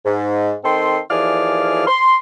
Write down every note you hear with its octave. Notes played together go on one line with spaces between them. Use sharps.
G#2
D#3 C4 A4 G5 C6
D#2 E3 F3 G#4 D5 F6
C6